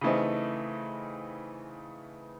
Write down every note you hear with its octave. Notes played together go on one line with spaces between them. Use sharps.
C#3 E3 A3 C4 D#4